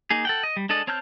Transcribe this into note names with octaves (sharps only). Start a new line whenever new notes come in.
A#3 D#4 G#4
A4 F#5 G5
D#5
G3
G#3 D4 A4 D#5
C4 C#5 A5 F6 G6